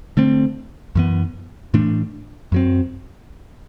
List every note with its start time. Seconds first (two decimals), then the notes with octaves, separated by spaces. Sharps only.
0.17 D3 A3 C4
0.95 F#2 E3 B3
1.74 A2 E3 A3 D4
2.52 F#2 F#3 C4